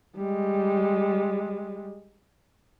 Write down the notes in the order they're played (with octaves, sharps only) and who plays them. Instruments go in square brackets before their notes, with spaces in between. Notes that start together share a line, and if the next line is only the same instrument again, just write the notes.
[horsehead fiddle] G3 G#3